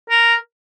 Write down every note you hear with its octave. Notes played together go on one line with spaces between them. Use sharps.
A#4